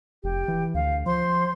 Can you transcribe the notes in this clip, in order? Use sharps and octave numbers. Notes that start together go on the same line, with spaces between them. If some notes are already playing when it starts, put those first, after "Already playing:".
F1 G4
E3
D2 F5
F3 C5 C6